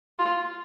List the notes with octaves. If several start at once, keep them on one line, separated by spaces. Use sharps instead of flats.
F4